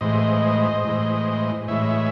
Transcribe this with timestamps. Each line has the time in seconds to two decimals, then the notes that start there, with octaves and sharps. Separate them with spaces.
0.01 A2 E3 G#3 C5 D#5
0.84 A2 E3 G#3
1.68 A2 E3 G#3 C#5 E5